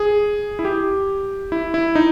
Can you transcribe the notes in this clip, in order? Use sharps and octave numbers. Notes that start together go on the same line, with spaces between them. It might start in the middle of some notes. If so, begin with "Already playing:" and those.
Already playing: G#4
E4
G4
E4
E4
D#4